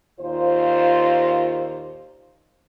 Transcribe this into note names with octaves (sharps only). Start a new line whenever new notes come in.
D#2 A#2 F4 C5